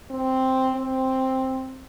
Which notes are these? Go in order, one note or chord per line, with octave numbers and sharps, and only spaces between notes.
C4
C4